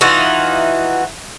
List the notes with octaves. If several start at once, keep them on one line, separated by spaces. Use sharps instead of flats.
E3 D#4 F4 F#4